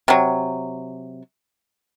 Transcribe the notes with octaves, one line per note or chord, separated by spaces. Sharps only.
C3 F#3